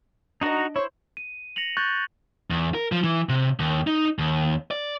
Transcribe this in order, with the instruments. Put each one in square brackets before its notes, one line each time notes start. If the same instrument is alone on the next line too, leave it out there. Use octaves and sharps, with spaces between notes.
[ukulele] D4 D5 D#5 [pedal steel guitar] D#4 F#4 A#5
[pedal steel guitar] E4 C5 [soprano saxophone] C#5
[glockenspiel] D#7
A#6 C#7 F7 F#7
C#6 F#6 G6 A6
[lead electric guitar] E2
A#4
F3
E3
C3
D#2
D#4
D#2
D5